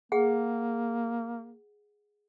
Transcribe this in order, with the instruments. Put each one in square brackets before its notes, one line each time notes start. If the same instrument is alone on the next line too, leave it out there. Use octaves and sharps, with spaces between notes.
[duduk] A#3 [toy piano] G#4 F#5